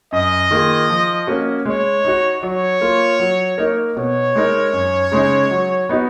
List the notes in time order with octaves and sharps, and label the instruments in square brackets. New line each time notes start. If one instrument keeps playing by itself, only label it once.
[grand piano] F#2 [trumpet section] D#5
[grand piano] D#3 A#3 F4 G#4
F3
A#3 C#4 F#4
[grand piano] G#3 [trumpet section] C#5
[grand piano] D#4 F#4
[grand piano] F#3 [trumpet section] C#5
[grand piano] A#3 F4
F#3
A#3 D#4 A#4
[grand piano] B2 [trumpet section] C#5
[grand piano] G#3 D#4 A#4
F#2
C#3 G#3 D#4 G#4
F#3
B3 D#4 F#4